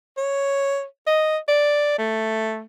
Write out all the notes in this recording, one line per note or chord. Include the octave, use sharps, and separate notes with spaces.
C#5
D#5
D5
A3